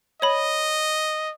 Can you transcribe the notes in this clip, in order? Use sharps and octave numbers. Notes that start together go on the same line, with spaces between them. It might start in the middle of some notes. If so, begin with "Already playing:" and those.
C#5 D#5 B5